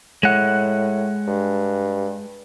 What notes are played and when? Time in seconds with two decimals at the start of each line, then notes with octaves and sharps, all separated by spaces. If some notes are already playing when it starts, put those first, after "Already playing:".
0.23 A2 G#3 F#5
1.28 G2